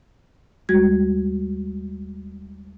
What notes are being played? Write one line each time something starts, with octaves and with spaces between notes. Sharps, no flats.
D#2 G3 G#3 F#4 G#6